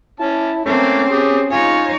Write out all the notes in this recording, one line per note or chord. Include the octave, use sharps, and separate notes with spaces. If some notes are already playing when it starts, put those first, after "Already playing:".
C#4 E4 A5
A3 A#3 C4 C#4
G4 G#4
D#4 F4 C#5 G#5